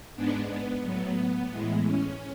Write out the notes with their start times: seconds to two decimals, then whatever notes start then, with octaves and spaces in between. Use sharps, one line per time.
0.15 G#2 G#3 B3 D4
0.50 B3
0.84 A2 F#3 B3
1.52 A2 E3 G#3
1.86 C#4